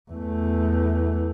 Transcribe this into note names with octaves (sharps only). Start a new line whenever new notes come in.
E2 A3